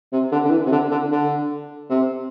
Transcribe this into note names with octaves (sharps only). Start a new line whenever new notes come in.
C3
D3
D3
E3
C3
D3
D3
D3
C3